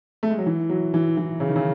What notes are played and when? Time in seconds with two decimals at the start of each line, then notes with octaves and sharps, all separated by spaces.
0.23 A3
0.30 G#3
0.38 F#3
0.46 E3
0.70 F#3
0.94 E3
1.17 E3
1.40 C#3
1.48 D#3
1.56 C#3